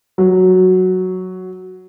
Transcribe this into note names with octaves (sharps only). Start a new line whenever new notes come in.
F#3